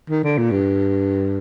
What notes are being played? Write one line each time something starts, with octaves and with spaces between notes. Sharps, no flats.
D#3
D3
A#2
G2